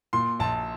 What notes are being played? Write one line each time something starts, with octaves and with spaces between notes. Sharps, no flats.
A#2 C6
A#1 A5